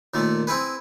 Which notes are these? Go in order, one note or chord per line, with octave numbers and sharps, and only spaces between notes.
D#2 A#2 A3
C4 E4 G#4 B4